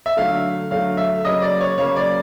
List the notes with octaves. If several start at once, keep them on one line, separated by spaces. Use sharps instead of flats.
E5
D3 F#3 A3 F5
D3 F#3 A3 F5
E5
C#3 F#3 A#3 D#5
D5
C#5
C#3 F#3 A#3 C#5
D5